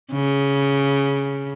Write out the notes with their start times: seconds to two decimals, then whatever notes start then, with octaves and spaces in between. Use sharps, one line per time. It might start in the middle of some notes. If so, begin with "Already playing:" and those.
0.13 C#3